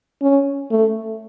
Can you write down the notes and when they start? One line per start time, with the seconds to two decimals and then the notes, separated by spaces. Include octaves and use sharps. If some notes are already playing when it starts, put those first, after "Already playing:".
0.22 C#4
0.71 A3